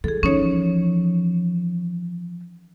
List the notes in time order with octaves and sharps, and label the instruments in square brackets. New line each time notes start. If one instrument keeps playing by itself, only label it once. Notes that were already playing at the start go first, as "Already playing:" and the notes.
[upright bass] E3 [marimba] G#4 A4
[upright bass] E3 F3 [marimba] C#4 D#4 C#5